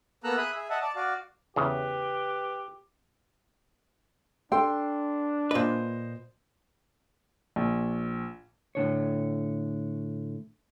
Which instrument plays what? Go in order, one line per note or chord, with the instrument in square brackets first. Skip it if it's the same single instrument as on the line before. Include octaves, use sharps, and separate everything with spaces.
[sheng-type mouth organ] A#3 B3 A4 A#5 E6 F#6
G#4 E5 B5 D#6 F#6
G#4 E5
D#5 E5 F#5 A5
D5 A5
F#4 D5 F5
[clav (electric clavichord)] E2 C#3 [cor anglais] G4 [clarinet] B4
[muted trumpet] D4 [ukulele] A4 G5 [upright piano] C6
[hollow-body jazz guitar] A#2 B4 [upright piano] C5 D#5
[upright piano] A#1
[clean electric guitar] A2 D3 C#5